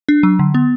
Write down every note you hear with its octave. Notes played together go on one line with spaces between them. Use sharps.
D4
F#3
D3
B3